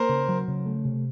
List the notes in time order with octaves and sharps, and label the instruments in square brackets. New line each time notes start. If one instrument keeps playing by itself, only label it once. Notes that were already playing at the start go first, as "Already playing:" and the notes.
Already playing: [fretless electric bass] A#3 [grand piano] A#4 C5
[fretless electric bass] C#3
F#3
C#3
A3
C3